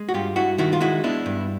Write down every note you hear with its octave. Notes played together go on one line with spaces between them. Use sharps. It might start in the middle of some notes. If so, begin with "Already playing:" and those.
Already playing: G#3
F#4
G2 F4 G4
G2 E4 F#4
D#3 E4 F#4
F4
G#3 E4 F#4
B3 D4 E4
G2